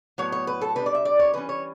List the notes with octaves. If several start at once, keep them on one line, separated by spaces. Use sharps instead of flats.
A2 F#3 B3 C#5
C#5
B4
A4
B2 G3 D4 B4
D5
E5
D5
C#5
E3 G3 C#4 B4
C#5